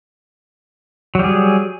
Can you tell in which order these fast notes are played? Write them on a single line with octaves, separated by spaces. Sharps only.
F#3 G3 G#4